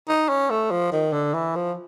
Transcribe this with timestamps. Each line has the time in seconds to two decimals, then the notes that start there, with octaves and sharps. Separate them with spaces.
0.09 D#4
0.29 C#4
0.50 A3
0.71 F3
0.92 D#3
1.13 D3
1.34 E3
1.56 F3